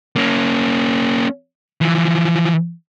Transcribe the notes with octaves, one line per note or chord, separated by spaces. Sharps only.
A#3 C#4
E3 F3